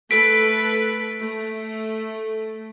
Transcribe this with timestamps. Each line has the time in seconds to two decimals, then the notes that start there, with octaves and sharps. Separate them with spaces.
0.11 A3 A4 B4 B6 D7
1.20 A3